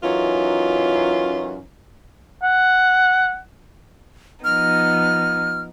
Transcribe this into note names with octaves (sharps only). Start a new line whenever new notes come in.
F#2 E3 C#4 D#4 F4
F#5
F3 B3 D#4 F6